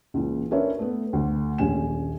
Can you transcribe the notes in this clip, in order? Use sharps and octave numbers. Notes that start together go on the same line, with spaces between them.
C#2 A#2 E3
C#4 D4 A#4 B4 C#5 E5
A3 B3
D2 D3
D#1 A#1 C#4 G#5 E7